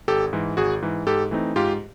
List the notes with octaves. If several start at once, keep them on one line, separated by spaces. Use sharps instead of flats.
G#1 G4 A4
G#2 E3
G#1 F#4 G#4
G#2 E3
G#2 G4 A4
E3 A3 C4 D#4
G#2 F4 G4